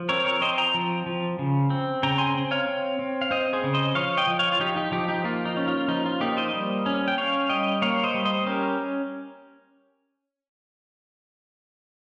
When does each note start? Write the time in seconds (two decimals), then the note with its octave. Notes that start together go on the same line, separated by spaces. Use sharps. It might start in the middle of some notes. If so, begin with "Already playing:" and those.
Already playing: F3
0.09 C4 A#4 C#5
0.25 A#4 C#5
0.41 C4 C5 D#5
0.58 G5 A#5
0.74 F3
1.06 F3
1.39 C#3
1.70 C4
2.03 C#3 G5 A#5
2.18 G#5 C6
2.35 C4
2.51 C#5 F5
2.67 C4
2.99 C4
3.21 F5
3.31 C4 C5 D#5
3.53 G#4 C5
3.64 C#3
3.74 C5 D#5
3.95 F3 C#5 F5
4.17 D#5 G5
4.27 F3
4.39 C#5 F5
4.52 F4
4.60 F3 D#4 G4
4.76 D#4 G4
4.92 F3 D#4 G4
5.08 D#4 G4
5.24 A#3 F4
5.45 D#4
5.57 C#4
5.68 F4
5.88 F3 D#4
6.06 F4
6.21 A#3 D#4 G4
6.37 C5 D#5
6.53 G3
6.86 C#4
7.08 G5
7.18 C#4 C#5 F5
7.49 G3 D#5 G5
7.82 A#3 C#5 F5
8.03 C5 D#5
8.14 G3
8.25 C5 D#5
8.46 C#4 G4 A#4